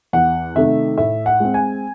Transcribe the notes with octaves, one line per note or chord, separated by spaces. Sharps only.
E2 F#5
C3 D#3 A3 E5
A2 E5
F#5
G#3 C4
G#5